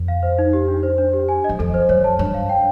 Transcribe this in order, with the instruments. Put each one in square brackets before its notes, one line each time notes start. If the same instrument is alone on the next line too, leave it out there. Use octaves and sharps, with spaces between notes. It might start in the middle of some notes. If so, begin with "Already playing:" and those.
Already playing: [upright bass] F2
[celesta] F5
C5
D#4
G4
D4
C5
D4
G4
G#5
[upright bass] F#2 [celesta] D#5
[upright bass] F2 [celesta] A4
[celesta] C5
[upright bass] F#2 [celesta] C#5
[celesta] A5
[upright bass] G2 [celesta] C#5
[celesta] F5
G5